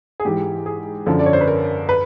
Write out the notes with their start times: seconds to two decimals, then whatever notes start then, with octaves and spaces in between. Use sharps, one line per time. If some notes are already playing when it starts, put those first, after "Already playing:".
0.20 G#4
0.25 G#2 E3 G4
0.66 G#4
1.06 F#2 D3 F3 A4
1.19 D5
1.26 C#5
1.33 C5
1.41 B4
1.48 A#4
1.89 B4